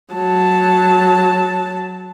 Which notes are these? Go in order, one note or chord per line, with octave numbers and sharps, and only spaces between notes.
F#3 A5